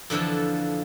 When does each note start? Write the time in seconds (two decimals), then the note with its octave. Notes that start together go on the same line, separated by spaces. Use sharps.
0.10 F2 D3 E3 F3 A4